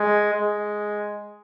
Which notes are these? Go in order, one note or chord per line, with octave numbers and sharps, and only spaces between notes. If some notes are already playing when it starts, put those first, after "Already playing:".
Already playing: G#3
G#3